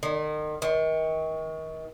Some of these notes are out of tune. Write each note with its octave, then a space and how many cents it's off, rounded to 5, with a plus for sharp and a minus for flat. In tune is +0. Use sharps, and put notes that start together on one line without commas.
D#3 -35
D#3 +35